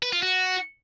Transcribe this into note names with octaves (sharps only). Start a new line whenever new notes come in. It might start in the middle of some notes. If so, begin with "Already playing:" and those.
B4
F4
F#4